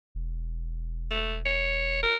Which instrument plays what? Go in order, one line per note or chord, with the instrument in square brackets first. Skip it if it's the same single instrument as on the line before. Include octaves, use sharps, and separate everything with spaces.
[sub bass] E1
[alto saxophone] A3
C#5
A#4